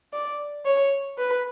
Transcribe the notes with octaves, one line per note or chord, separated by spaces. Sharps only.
D5
C#5
B4